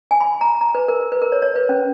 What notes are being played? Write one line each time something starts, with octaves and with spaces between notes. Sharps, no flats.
G#5
B5
A#5
A#5
B4
A#4
B4
A#4
C#5
C#5
B4
C#4